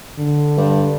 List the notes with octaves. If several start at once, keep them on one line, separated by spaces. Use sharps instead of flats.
D3
G2